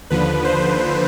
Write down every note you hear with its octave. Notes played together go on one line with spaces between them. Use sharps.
D#2 D3 F3 B4
C5